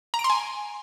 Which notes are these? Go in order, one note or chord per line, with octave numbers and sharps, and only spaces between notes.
A#5
D7
C6
G#5